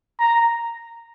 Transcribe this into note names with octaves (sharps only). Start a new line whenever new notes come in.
A#5